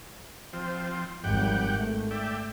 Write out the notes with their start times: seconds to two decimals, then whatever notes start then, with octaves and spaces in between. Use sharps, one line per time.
0.53 F3 C4
1.24 G#1 F2 G3 G4 F#5 G5
1.70 G#2 A3
2.11 D5 E5 G5